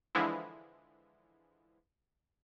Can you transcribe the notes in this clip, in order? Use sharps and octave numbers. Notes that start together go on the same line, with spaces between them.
D3 E3 F3 G#3 E4